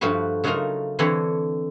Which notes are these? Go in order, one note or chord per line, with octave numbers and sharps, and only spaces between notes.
G2 F3 A3 F#4 B4
C#3 F#3 A3 D#4 F4 A#4
D3 E3 C4 A4 C#5 B5